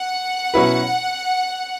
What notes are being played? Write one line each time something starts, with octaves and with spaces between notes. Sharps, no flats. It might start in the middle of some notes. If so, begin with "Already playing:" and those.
Already playing: F#5
B2 F#3 C#4 E4 B4